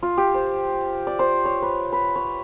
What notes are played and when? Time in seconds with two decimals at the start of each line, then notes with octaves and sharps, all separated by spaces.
0.03 F4
0.17 G4
0.34 C5
1.07 D5
1.19 C5
1.45 C#5
1.62 B4
1.93 B4
2.16 C#5